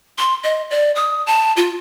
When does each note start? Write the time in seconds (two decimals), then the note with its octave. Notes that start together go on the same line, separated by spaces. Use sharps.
0.18 C6
0.44 D#5
0.71 D5
0.96 D#6
1.27 A5
1.57 F4